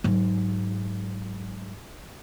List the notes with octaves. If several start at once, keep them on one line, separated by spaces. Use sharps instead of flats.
G#2 F#3